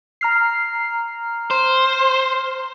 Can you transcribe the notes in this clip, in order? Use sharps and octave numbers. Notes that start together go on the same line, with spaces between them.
A#5 F6 C7
C5